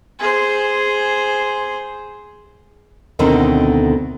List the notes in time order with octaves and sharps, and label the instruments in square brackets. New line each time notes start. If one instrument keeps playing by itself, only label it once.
[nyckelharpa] G#4 C5
[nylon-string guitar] D2 B2 D3 D#3 C4 C#4